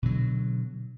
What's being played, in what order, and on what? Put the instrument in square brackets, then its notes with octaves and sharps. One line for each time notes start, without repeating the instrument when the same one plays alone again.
[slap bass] B2 D3 F#3